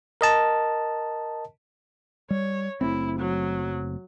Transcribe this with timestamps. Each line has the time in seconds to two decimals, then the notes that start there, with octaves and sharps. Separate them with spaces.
0.21 A#4 D#5 A5
2.30 G3 C#5
2.81 F#1 A3 C4 E4
3.19 F#3